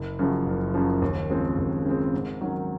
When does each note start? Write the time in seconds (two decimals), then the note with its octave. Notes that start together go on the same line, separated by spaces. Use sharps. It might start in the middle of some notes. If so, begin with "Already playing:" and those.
Already playing: F#1
0.19 F#2 C#3 F3
0.46 F#1
0.74 F#2 C#3 F3
1.02 D#2
1.30 C#3 F3 G#3 C4
1.58 D#2
1.85 C#3 F3 G#3 C4
2.14 G#2
2.41 D#3 F#3 C#4